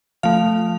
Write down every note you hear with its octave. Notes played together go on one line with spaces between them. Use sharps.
F3 A3 F5